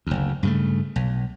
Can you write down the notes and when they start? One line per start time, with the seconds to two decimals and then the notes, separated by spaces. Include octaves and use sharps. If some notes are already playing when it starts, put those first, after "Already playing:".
0.07 F#1 D2
0.43 G2 C#3 A3
0.96 B1